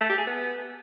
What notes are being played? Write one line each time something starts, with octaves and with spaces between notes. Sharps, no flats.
A3
G4
G#4
B3